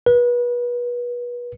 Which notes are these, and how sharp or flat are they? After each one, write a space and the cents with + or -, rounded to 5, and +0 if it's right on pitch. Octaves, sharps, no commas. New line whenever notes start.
B4 -30